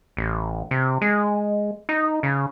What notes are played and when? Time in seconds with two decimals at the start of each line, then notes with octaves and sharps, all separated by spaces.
0.17 A1
0.71 C3
1.02 G#3
1.89 D#4
2.23 C#3